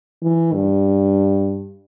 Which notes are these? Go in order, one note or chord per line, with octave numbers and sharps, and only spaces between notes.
E3
G2